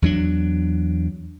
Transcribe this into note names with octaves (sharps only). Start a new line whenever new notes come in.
E2 F#3 D4